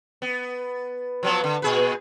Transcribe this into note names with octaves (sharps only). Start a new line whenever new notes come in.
B3
F3 F#3 B3
D3
A#2 G#4 B4